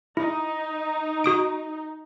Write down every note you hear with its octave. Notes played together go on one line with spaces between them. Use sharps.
D#4 E4
F#4 D#6 D7